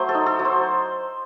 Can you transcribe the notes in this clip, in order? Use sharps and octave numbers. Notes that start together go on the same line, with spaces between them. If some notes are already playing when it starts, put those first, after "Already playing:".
Already playing: F#3 A3 C5
A4
D#4
A4
F#3
C5